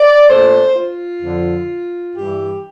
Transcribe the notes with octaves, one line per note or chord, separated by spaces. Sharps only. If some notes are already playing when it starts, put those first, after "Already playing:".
Already playing: D5
A#2 A3 D4 C5
F4
F2 D3 F3
G2 E3 G3 G4